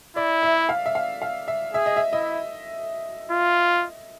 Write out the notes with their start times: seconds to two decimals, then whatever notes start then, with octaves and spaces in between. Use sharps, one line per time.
0.16 E4 D5
0.43 E5
0.69 F5
0.86 E5
0.95 F5
1.22 F5
1.48 E5
1.74 G#4 E5
1.86 D#5
1.97 E5
2.13 E4 D#5
3.31 F4